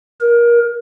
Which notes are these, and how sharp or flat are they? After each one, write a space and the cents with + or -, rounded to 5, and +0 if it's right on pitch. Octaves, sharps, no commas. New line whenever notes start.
A#4 +25